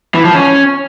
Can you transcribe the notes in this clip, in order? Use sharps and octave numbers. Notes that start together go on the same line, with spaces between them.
E3
F3
C#4